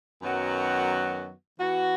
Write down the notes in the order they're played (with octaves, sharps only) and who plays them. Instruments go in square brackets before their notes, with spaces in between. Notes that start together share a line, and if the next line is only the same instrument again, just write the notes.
[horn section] F#2 D#3 F#3 B3 F#4
E3 B3 F#4